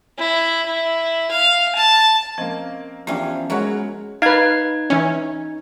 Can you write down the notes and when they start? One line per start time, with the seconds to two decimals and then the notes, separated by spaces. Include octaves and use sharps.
0.18 E4
0.66 E4
1.31 F5
1.76 A5
2.38 F3 A#3 C4 C#4 D#5
3.07 E2 F3 A#3 C#4 D4 E4 G4 F5
3.50 F#3 G#3 E4 F#4 A#4 C#5 F#5
4.22 D#4 B4 F5 G#6
4.90 E3 C#4